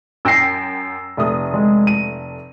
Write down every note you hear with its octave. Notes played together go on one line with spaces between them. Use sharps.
F#2 G5 E6 A#6 C7
F1 A3 D#6
G#3
D#7